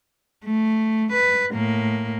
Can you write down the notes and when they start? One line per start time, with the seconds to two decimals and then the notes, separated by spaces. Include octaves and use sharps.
0.45 A3
1.13 B4
1.52 A2 A#3